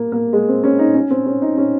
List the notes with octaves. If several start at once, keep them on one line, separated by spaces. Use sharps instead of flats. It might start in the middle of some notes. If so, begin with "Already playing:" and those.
Already playing: A#3
A#3
G#3
C4
C#4
D#4
C#4
C4
C#4
D#4
C#4